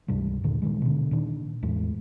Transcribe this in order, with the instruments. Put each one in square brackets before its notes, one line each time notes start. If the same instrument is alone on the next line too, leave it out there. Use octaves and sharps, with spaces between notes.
[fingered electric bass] C#2 G2 C3 G3
D#2 A#2 D3 D#3
A#2 D#3 G#3
B2 D3
A#2 D#3 D4
E2 A2 G#3 A3